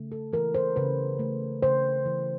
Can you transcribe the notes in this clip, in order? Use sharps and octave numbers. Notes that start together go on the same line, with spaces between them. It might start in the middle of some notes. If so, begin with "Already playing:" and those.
Already playing: C#3 A3
A4
E3 A#4
C5
C#3 B4
A3
C#3 C5
E3